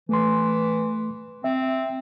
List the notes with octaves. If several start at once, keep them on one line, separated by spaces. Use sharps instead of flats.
E3 A3 C6
C4 E5